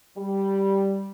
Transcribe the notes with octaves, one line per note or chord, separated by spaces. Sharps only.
G3